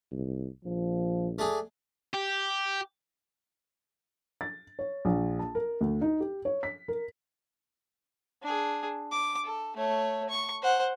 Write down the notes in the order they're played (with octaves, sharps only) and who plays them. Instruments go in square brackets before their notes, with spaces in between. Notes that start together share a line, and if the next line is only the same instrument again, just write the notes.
[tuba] C2
[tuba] A#1 [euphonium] F3
[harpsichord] A3 D4 G#4
[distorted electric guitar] G4
[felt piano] A6
C#5
A#1
A5
A#4
D2
D#4
G4
C#5
B6
A#4
[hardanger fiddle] D4 G#4
D6
A4
A3 C#5
C#6
C5 F#5